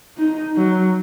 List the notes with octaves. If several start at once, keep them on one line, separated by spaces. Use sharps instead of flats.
D#4
F#3